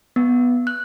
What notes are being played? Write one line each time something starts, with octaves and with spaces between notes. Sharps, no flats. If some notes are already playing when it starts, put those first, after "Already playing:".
B3
F#6